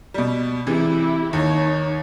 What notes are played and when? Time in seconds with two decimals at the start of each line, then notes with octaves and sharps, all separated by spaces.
0.14 B2 G3
0.67 C3 E3 G#3 E4 G4
1.33 D#2 D#4 C#5